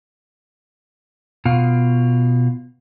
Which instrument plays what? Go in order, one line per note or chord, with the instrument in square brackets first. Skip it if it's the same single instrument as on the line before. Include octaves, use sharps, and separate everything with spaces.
[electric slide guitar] B2 F4